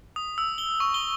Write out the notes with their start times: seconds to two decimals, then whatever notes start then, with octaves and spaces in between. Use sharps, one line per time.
0.16 D#6
0.38 E6
0.58 G7
0.80 C#6
0.94 G7